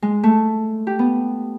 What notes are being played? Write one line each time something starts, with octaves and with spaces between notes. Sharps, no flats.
G#3
A3
G4
B3